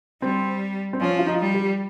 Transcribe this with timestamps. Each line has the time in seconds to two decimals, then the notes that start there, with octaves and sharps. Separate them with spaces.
0.22 G3 C4
0.93 C4
1.00 F3 C#4
1.19 F4
1.27 D#4
1.40 G3
1.54 G4